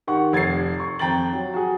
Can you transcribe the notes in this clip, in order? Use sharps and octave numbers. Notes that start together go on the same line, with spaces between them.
D#3 G4 F#5 C#6
F1 G#6 A6 C7
C#6
F2 C4 G5 A#5 A6 F#7
F#3
F#4 G#4